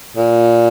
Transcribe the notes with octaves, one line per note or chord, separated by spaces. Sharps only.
A#2